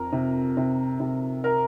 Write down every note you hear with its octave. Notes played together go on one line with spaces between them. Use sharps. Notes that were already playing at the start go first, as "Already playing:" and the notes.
Already playing: F2 A#4 A#5
C3
C3
C3
A#4 A#5